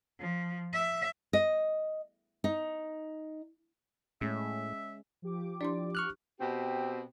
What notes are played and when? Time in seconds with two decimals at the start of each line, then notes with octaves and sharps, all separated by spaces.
0.20 F3
0.73 E5
1.33 D#5
2.44 D#4
4.21 A2 G#3 C#4 G#4 E5
5.22 F3 G4 D6
5.61 D4 E4 D5 C6
5.95 C#6 F6 F#6
6.41 B2 C4 G4